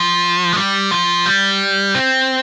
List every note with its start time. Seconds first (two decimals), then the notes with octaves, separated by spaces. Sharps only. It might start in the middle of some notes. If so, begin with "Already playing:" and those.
Already playing: F3
0.53 G#3
0.57 G3
0.91 F3
1.26 G3
1.95 C4